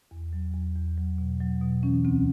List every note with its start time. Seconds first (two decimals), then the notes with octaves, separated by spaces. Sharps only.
0.11 E2
0.33 F#3
0.54 E2
0.75 E2
0.97 F#3
1.18 B2
1.40 F#3
1.62 B2
1.83 E3 C#4
2.04 D2 C4